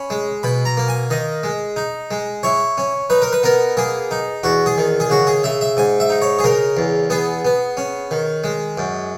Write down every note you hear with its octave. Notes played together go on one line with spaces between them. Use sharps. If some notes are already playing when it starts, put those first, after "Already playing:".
Already playing: C#4 B5
G#3
B2 B5
A#5
A#3
G#5
D#3 D#5
G#3
D#4
G#3
E4 C#5
C#4
D#4 B4
A#4
B4
B3 A#4
A#3 G#4
D#4
E2 F#4
G#4
D#3
G#4
C#3 F#4
G#4
C#3 E5
E5
G#2 G#5
E5
D#4
C#5
G#4
C#3 A#4
E2
B3 G#4
B3
C#4
D#3
G#3
F#2